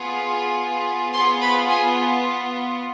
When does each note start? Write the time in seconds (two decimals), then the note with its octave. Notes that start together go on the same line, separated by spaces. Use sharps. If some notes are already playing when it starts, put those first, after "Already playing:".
Already playing: B3 F4 G#4
1.12 B3 F4 G#4 C5 C6
1.41 B4 B5
1.69 G#4 G#5